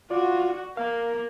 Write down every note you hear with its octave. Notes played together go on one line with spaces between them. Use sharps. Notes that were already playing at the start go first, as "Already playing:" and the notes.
F4 F#4 D5
A#3 A#4 F5